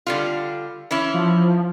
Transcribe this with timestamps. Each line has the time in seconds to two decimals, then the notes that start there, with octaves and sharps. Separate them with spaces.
0.07 D3 G3 F4
0.91 E3 C#4 E4
1.14 F3